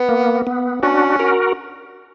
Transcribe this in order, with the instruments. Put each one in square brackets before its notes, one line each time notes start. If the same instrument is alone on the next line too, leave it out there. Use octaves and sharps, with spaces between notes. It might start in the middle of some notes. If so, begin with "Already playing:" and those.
Already playing: [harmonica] B3
[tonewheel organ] A#3
B3
[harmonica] C#4 [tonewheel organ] D4 F#4
[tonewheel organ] F#4 A#4